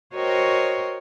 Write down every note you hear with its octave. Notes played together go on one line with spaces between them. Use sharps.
F#4 A#4 C5 C#5 D#5 G5